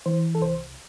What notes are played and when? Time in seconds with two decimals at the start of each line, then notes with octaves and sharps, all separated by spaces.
0.06 E3 C5
0.35 A4
0.42 C2 C5